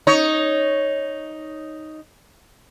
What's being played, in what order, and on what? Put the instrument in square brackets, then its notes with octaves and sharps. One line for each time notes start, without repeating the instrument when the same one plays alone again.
[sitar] D#4 C#5